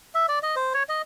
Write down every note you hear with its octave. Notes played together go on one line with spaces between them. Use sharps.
E5
D5
D#5
C5
C#5
D#5